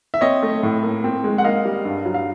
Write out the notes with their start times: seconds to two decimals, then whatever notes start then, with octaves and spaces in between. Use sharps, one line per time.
0.14 E5
0.21 C4 C#5 D#5
0.43 A3
0.63 A2
0.83 A#3
1.04 C4
1.24 G#3
1.38 F#5
1.44 A#3 D#5 F5
1.65 G3
1.85 G2
2.05 F#3
2.14 F5